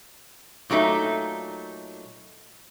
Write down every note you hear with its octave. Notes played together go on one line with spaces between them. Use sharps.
A#2 F#3 A3 D#4